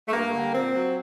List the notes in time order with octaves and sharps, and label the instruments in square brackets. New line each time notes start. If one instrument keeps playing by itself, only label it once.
[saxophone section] A3
G2 A#3
D3 G3
A#2 C4
F#3